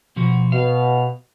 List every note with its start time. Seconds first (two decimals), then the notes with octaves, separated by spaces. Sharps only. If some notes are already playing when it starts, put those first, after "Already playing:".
0.16 B2 F3 F#4
0.52 B2 F5